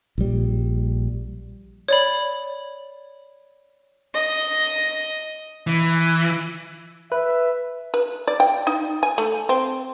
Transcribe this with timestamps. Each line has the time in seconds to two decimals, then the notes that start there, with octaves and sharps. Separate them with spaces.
0.18 A#1 G3
1.88 C#5 D5 B5
4.13 D#5 A#6
5.67 E3
7.12 B4 E5
7.94 B4
8.28 D5
8.40 G5
8.67 D#4
9.03 G#5
9.18 A3
9.49 C4